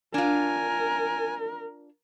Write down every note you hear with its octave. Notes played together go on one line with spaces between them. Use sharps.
D4 F4 A#4 G#5